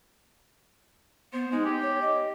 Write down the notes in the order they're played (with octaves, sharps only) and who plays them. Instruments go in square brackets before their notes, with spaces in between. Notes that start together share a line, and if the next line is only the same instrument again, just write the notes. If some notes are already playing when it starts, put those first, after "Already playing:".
[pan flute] B3 [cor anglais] C5
[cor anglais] G#3 [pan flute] D#4
[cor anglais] G4
[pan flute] C#5
D#5